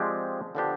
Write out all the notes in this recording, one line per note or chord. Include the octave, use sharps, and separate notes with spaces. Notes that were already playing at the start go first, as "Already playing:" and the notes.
Already playing: F3 G#3 C4 G4 D5
D3 F3 B3 D4 G4